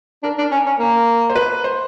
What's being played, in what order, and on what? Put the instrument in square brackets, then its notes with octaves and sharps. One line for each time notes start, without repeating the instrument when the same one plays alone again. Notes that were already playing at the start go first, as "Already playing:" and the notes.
[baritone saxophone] D4 [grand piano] A#4
[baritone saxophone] D4
C#4
C#4
A#3
[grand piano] C5
B4
C5